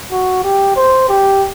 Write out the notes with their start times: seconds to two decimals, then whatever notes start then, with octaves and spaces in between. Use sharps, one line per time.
0.12 F#4
0.44 G4
0.76 C5
1.09 G4